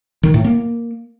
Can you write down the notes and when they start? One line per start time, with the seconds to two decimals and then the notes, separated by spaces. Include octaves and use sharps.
0.23 D#3
0.34 A2
0.45 A#3